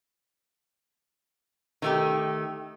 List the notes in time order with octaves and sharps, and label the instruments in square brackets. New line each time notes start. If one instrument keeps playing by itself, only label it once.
[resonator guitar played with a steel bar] D#3 A3 G4